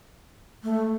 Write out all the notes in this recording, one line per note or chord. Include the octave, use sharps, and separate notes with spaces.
A3